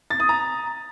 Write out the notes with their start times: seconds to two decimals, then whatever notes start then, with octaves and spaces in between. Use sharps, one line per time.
0.10 A6
0.20 D#6
0.29 A#5